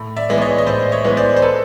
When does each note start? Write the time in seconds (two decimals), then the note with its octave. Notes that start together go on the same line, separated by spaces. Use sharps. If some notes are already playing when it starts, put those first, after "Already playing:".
Already playing: A2
0.17 D5 E5
0.29 E3 G#3 B3
0.38 D5
0.41 C#5 D#5
0.58 D#5
0.67 A2 C5 D5
0.92 C#5 D#5
1.04 E3 G#3 B3
1.17 C5 D5
1.36 C5
1.42 A4 B4